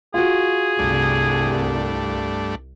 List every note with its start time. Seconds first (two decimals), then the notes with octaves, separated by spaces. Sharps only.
0.14 F4 F#4 G#4
0.79 C2 G2 A3 D4